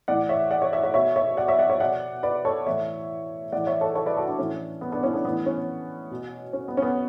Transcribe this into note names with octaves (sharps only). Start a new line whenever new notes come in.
A2 E3 D5 F#5
C#5 E5
D5 F#5
C#5 E5
C#5 E5
C#5 E5
B2 C#5 E5
C#5 E5
D5 F#5
C#5 E5
D5 F#5
C#5 E5
B2 D5 F#5
B4 D5
A4 C#5
A2 E3 C#5 E5
A2 E3 D5 F#5
C#5 E5
A4 C#5
A4 C#5
B4 D5
F#4 A4
D4 F#4
A2 E3 C#4
B3
B3 D4
C#4 E4
B3 D4
A2 E3 B3
C#4
B2
C#4
B3
C#4
B3